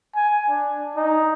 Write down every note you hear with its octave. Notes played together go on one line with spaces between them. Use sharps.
G#5
D4
D#4